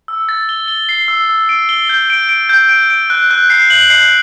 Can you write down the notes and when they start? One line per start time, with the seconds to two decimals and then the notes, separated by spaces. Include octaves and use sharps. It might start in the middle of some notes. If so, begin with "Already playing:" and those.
0.08 E6
0.29 A6
0.49 G7
0.68 G7
0.89 C7
1.08 E6
1.29 E6
1.49 D7
1.69 G7
1.89 G6
2.10 D7
2.29 D7
2.49 G6
2.69 D7
2.90 D7
3.10 F#6
3.31 F#6
3.50 C7
3.70 F#7
3.90 C7